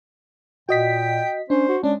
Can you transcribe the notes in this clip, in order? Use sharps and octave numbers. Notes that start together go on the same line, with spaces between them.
A#2 F#4 D#5 G5 B6
C#4 D4 C5
F#4
G#3 C#4 D4